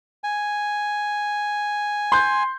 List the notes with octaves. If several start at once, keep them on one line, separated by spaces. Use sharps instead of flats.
G#5
C6 G6